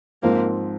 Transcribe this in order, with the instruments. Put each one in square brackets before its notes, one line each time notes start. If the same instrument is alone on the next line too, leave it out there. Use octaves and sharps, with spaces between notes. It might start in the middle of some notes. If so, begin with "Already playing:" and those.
[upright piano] G#2 F3 C4 [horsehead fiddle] A#3